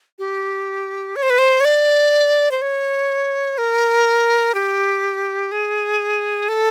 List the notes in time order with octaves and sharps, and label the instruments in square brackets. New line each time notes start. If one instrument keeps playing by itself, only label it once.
[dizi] G4
C#5
C5
B4
C5
C#5
D5
C5
C#5
A#4
G4
G#4
A4